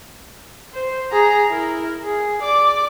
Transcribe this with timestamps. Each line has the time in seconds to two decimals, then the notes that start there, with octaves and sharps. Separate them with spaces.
0.74 C5
1.12 G#4 A#5
1.49 E4 A#4
2.04 G#4
2.42 D5 D6